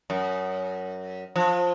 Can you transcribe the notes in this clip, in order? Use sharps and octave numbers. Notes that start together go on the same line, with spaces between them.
F#2
F3